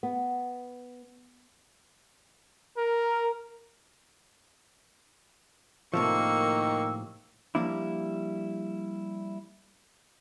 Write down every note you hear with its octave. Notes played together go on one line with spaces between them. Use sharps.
B3
A#4
A2 C3 D#3 F3 A#3 C#6 E6
F3 G3 A3 A#3 D4 E4